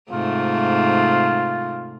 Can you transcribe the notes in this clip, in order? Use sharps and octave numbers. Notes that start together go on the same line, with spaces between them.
G#2 C3 A3 F4